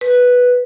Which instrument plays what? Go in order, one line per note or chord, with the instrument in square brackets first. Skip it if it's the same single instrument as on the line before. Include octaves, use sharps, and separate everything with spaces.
[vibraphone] B4